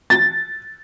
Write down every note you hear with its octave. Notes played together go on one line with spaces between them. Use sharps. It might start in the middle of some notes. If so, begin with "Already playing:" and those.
A6